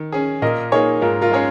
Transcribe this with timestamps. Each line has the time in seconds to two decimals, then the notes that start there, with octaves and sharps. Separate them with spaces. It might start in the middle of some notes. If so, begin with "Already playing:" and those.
Already playing: D#3
0.12 C#4 G#4
0.42 A#2 A#4 D#5
0.72 A#3 D#4 G#4 C#5
1.02 G#2 F4 A#4
1.21 F4 A#4
1.31 G#3 C#4 G#4 C#5